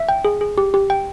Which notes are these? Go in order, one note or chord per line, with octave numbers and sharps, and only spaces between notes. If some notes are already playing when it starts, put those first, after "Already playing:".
Already playing: E5
G5
G#4
G#4
G4
G4
G5